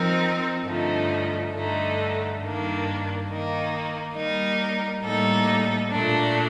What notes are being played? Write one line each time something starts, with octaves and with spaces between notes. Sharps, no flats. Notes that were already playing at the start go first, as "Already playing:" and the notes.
Already playing: F3 C4 D#4 A#4
G2 D3 F3 A3 D#4
G2 D3 A3 D#4
G2 D#3 A#3 D4
D#3 A#3 D#4
G3 A#3 D#4 A#4
A2 G3 A#3 D#4 A4
A#2 A3 D4